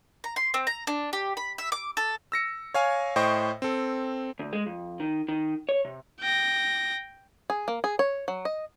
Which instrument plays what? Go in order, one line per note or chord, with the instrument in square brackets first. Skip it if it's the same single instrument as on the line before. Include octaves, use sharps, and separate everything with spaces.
[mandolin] A#5
C6
C4
A#5
D4
G4
B5
E5
D6
A4
[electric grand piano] E6 A#6 C#7
C#5 F5 G#5
A2 C5 D#5 G5 C#6
C4 A4
[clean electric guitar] D2
G#3
F2
D#3
D#3
C#5
C3
[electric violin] G5 A#6
[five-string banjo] G#4
A#3
G#4
C#5
F#3
D#5